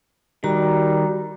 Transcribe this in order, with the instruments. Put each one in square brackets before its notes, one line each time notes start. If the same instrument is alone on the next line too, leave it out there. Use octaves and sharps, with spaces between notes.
[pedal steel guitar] D#3 [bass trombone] G3 [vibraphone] F#4 A#5